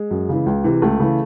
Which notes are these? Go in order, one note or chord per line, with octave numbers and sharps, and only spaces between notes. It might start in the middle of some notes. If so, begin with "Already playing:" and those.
Already playing: G#3
F#2
C#3 E3
C#2
C3 E3
C#2 A3
C#3 E3